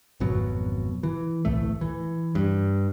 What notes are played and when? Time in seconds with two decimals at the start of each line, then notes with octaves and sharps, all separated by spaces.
0.20 G#1 F2 B2 F#3
1.03 E3
1.45 D1 B1 A2 A3
1.81 E3
2.35 G2